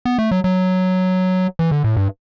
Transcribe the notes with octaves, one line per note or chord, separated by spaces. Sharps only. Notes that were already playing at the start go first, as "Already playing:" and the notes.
B3
A3
F#3
F#3
E3
D3
A2
G2